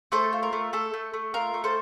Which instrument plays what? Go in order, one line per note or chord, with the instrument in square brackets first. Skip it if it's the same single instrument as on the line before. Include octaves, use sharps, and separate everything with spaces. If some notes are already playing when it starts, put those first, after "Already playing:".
[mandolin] A3 A4 C5
F4
A#4
A3
A3 A4
A3
A3
F4 A#4
A3
A4 C5